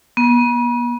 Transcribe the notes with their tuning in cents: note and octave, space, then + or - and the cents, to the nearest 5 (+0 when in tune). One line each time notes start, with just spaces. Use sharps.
B3 -40